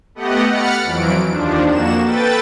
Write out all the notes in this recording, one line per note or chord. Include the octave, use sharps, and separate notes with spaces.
A3 B3 G4 D#5 F#5
F#5 B5 F6 A6 C#7
F2 E3 F#3 D7
D#2 F3 D4
F2 A#3 F#4 E7
A4 B4 G5 A6